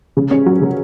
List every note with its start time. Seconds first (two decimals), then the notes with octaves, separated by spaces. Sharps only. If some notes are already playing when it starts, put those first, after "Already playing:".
0.17 C#3
0.31 C#4
0.46 F#3
0.61 C#3